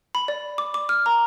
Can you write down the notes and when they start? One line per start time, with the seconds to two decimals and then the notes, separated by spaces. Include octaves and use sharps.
0.15 B5
0.28 D5
0.58 D6
0.74 D6
0.89 F6
1.06 A#5